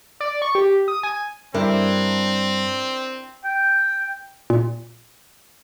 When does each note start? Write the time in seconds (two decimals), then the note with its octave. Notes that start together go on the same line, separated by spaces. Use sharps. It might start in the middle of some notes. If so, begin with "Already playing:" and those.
0.20 D5
0.42 C#6
0.55 G4
0.88 D#6
1.03 G#5
1.54 G2 C4 D4 E4 A#4
3.44 G5
4.50 A#2